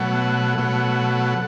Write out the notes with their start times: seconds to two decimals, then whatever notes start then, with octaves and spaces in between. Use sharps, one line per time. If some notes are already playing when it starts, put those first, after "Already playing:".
Already playing: B2 F#3 A3 F#5
0.58 B2 F#3 A3